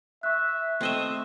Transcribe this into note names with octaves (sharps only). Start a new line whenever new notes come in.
E5 C#6 F#6
A3 C4 D#5 E5